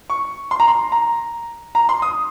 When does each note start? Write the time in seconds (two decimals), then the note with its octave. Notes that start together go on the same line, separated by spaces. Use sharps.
0.10 C#6
0.51 C6
0.60 A#5
0.68 C6
0.92 A#5
1.75 A#5
1.89 C6
2.02 D#6